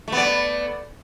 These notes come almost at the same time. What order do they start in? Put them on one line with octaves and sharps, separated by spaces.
A3 B3 D5